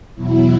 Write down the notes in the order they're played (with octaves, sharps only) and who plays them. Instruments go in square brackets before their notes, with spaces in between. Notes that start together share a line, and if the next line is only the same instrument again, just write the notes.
[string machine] E2 B2 F#3 E4